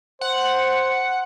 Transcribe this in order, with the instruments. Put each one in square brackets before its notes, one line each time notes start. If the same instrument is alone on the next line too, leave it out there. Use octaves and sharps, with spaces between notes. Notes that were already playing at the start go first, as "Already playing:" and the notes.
[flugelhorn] C5 [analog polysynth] F#5